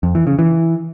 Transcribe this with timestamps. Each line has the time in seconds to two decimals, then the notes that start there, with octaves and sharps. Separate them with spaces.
0.03 F2
0.15 E3
0.27 C#3
0.39 E3